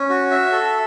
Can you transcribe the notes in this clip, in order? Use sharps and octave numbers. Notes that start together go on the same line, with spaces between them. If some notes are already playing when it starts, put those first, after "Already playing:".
Already playing: C#4
F#4
E5
A4